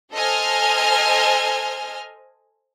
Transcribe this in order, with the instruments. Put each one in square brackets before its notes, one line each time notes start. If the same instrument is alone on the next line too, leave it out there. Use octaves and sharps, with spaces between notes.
[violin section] A4 C5 D#5 G#5 F6